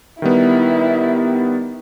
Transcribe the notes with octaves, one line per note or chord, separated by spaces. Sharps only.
D#3 G3 B3 E4